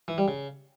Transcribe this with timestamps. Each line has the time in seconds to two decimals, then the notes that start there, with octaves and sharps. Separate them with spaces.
0.08 E3
0.18 G3
0.28 C#3